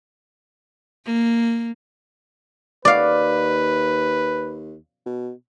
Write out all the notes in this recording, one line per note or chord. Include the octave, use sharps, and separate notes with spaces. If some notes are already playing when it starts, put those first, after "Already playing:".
A#3
D#2 B4 D5 F5
B2